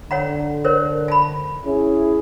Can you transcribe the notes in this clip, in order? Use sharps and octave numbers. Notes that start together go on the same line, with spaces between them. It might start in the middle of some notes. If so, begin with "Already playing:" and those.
D3 C#5 F#5 A#5
A#4 C5 C#5
A5 B5
C#4 E4 G#4